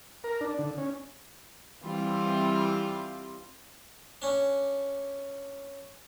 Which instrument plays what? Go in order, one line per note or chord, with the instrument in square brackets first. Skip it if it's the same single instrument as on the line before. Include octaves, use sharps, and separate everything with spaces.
[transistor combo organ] A#4
D4
D3
C#4
[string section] E3 G3 C4 F4
[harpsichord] C#4 D4